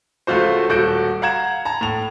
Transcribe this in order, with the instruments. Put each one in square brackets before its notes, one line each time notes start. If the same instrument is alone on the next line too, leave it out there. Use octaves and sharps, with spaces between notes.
[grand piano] C#2 A3 F4 F#4 C5
D#1 F#4 A4 G6 D7
F5 F#5 A#5 G#6 E7
A5 A#5
A2 F7